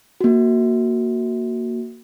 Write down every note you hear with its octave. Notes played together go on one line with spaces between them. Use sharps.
A#3 F#4